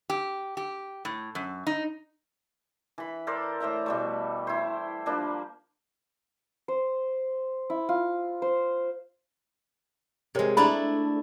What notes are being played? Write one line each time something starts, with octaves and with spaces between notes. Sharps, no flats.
G4
G4
A2
F#2
D#4
E3 B5
A4 A#4 C5 D5
A2 C5 E5 A#5
B2 G3 A3
E4 C5
F3 G3 A#3 D4
C5
E4
F4
C5
C3 G#3 A#4 C#5
A3 D4 E4 A#5 B5